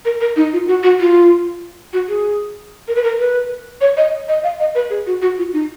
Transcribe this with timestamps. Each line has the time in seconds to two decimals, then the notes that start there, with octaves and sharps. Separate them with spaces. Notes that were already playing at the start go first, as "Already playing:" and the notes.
0.05 A#4
0.21 A#4
0.36 D#4
0.53 F4
0.67 F#4
0.83 F#4
1.00 F4
1.93 F#4
2.08 G#4
2.88 A#4
2.96 B4
3.03 A#4
3.19 B4
3.81 C#5
3.97 D#5
4.28 D#5
4.44 F5
4.60 D#5
4.75 B4
4.90 G#4
5.07 F#4
5.22 F#4
5.38 F4
5.53 D#4